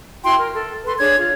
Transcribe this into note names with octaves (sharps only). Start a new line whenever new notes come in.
E4 F#4 G5 C6
A#4
A4
A4 B4 C6
D4 G#4 C#5 G#6
F4